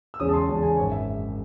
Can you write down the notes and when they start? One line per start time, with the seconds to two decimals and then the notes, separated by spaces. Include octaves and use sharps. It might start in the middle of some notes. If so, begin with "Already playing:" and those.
0.14 E6
0.20 E2 C#3 G#3 C#4 D#6
0.29 A5
0.34 C6
0.49 E2 C#3 G#3 C#4 A5
0.63 G#5
0.77 G#1 F#2 D#3 C#5
0.91 E5